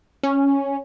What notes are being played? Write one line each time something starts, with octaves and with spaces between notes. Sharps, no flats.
C#4